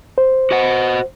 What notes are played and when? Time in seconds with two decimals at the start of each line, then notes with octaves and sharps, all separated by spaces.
0.18 C5
0.51 F#4 D#5 F#5